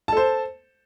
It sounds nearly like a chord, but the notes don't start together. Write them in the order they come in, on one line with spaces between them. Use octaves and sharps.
A5 A4 C5